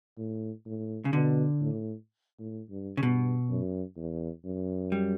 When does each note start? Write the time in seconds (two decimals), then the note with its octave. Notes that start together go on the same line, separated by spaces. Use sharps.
0.18 A2
0.66 A2
1.05 C#3
1.12 B2 D3
1.60 A2
2.39 A2
2.70 G2
2.97 C#3
3.02 G2 B2
3.49 F#2
3.97 E2
4.45 F#2
4.92 G3